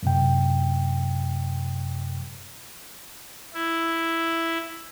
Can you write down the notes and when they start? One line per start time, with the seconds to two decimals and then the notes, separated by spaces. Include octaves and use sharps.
0.03 F#2 C3 G5
3.54 E4